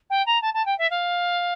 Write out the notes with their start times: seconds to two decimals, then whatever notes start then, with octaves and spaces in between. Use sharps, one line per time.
0.10 G5
0.26 A#5
0.42 A5
0.54 A5
0.66 G5
0.78 E5
0.90 F5